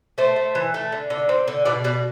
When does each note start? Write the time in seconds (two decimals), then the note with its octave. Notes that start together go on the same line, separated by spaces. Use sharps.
0.18 A3 C5
0.36 A3
0.55 E3
0.74 A3
0.92 D3
1.10 D3
1.29 C4
1.48 D3
1.65 B2 D5
1.84 B2 D5